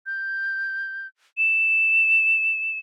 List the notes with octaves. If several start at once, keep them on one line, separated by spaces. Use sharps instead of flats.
G6
E7